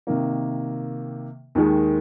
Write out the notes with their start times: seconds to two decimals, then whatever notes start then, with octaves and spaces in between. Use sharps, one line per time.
0.07 C3 D#3 A#3
1.55 D#2 D#3 G#3